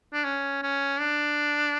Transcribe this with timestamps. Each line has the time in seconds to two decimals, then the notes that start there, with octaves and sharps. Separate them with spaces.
0.13 D4
0.25 C#4
0.63 C#4
1.00 D4